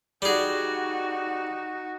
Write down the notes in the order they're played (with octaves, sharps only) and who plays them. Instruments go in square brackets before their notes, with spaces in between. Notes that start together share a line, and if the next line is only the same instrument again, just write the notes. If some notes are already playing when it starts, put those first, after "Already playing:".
[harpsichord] G3 G#4 [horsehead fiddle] D#4 F#4